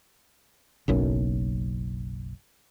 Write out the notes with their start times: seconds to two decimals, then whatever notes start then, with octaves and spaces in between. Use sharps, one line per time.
0.88 F#1 B1 F#2